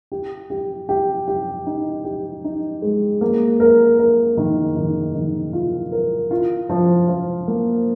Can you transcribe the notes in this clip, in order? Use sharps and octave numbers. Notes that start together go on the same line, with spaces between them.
G4
G4
G4
G4
D#4
G4
D#4
G#3
A#3
A#4
A#4
D#3
D#3
D#3
F4
A#4
F4
F3
F3
A#3